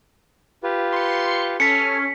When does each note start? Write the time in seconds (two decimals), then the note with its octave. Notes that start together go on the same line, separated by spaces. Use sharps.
0.63 F4 G4 B4
0.93 C6 C#7
1.60 C#4 A4 F6 B6 C#7